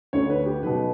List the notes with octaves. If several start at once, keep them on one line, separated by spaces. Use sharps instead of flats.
D2 D3 C#5
B4
G4
B1 B2 B4